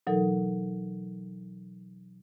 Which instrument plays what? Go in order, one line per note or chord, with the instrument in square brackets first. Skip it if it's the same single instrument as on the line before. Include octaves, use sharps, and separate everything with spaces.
[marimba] B2 E3 F#3 D#4 A4 A#4